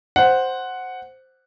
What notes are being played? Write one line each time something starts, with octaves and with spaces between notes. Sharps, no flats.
C5 F#5